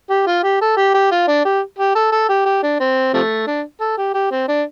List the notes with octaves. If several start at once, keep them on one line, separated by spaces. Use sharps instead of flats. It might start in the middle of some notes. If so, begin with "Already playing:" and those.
G4
F4
G4
A4
G4
G4
F4
D4
G4
G4
A4
A4
G4
G4
D4
C4
C3 F3 A3
D4
A4
G4
G4
C4
D4